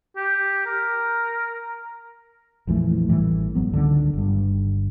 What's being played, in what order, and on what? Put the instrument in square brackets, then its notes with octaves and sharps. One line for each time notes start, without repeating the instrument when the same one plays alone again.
[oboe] G4
A#4
[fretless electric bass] A#1 F2 E3 A3
A1 A2 E3 G3
G1 G#2 F#3 B3
C#2 D3 D#3
G1 G2